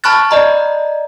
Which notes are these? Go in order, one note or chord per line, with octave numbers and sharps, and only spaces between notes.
A5 B5 C#6 F6 F#6 A6
D5 D#5 A#5